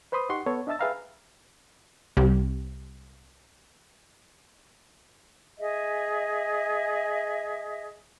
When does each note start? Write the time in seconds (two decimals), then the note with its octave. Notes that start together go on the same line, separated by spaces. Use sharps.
0.12 B4 C5 B5 C6 D#6
0.29 D#4 G4 F#5 C6 C#6
0.46 B3 A4 C#5
0.67 D4 D#5 E5 A5 E6 A6
0.79 G#4 B4 E5 F5 G5 A#5
2.17 C2 C3
5.59 G#4 D#5 E5